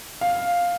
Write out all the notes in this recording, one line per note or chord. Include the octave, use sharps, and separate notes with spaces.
F5